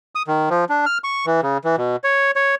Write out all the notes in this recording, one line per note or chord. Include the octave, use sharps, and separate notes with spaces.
D#6
D#3
F3
D4
F6
C#6
E3
C#3
E3
B2
C#5
C#5